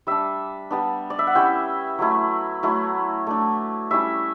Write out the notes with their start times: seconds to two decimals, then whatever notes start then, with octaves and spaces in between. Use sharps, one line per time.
0.07 G3 D4 E5
0.70 G3 B3 D4
1.10 D5
1.19 E5
1.27 F#5
1.35 G3 C#4 E4 G5
1.99 F#3 A3 E4
2.63 F#3 A3 E4
3.27 A3 D4
3.91 G3 C#4 E4 E5